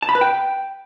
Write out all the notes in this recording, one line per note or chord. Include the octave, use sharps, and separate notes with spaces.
A5
B5
B4
G5